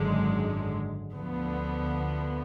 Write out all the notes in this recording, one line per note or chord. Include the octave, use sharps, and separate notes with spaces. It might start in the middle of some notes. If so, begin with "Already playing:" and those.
Already playing: G#1 F#2 D3 G#3
D2 D3 F3 B3